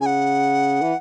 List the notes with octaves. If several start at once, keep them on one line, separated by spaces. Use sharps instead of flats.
C#3 G#5
F#5
E3